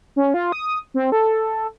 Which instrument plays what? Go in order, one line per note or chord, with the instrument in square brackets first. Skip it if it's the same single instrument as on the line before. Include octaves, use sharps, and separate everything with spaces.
[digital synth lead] C#4
F4
D#6
C4
A4